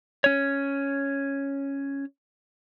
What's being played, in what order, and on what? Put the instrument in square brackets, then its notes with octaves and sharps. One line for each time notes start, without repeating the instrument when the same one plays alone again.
[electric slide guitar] C#4 C#5